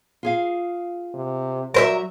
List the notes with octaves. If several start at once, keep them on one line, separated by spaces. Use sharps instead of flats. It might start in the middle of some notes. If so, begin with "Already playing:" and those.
F4 G#4 F5
C3
F#3 G3 A#4 C5 E5